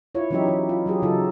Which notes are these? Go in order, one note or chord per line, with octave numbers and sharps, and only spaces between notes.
E4 F4 C#5
E3 F#3 C#4 D#4 G4 E5
E3 D#4
F4
F#3 G4 G#4
C#3 F#3 D#4 F4 A4